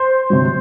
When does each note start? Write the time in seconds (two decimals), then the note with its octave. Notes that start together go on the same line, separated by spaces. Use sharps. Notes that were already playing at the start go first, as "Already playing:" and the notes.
Already playing: C5
0.30 C3 F#3